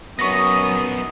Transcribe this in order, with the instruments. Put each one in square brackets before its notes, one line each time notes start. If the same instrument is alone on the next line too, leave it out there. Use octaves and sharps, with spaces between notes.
[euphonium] F#2 [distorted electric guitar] B3 D#4 [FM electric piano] C#6 A#6 [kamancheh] D#6